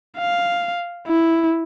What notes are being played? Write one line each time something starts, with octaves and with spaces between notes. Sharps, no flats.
F5
E4